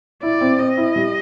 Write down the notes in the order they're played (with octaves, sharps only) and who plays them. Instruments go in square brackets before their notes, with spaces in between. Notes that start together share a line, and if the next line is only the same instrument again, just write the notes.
[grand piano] E4 [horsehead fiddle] D5
[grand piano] C4
[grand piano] C4 [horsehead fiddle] D#5
[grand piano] E4
G3